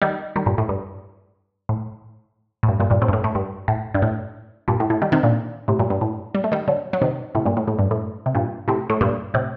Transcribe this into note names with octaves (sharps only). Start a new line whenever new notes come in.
D#3 G3
D#3 G3
G2 A#2
A2
G2
A2
A2
G2
G2 A#2
G2 A#2
A2 C3
G2
A2
A2
G2
A2
G2
A2
G2 A#2
A2
A2
D#3 G3
C3 D#3
A#2 D3
A2 C3
G2 A#2
G2
A2
G3
A3
D#3 G3
D3 F#3
F#3
C3 D#3
A2 C3
G2 A#2
A2
A2
G2
A2
C3
G2 A#2
A2 C3
A2
G2 A#2
A2 C3